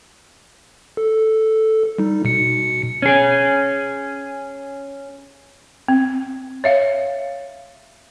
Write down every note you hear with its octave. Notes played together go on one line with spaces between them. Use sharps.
A4
G3 D#4
B2 C#7
C#4 G#4
C4
C#5 E5 F5